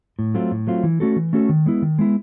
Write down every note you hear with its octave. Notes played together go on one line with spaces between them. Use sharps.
A2
F#3 A3 C4 F4
A2
F#3 A3 C4 F4
E3
A3 C#4 F#4 A4
E3
A3 C#4 F#4 A4
D#3
G#3 B3 E4
D#3
G#3 B3 E4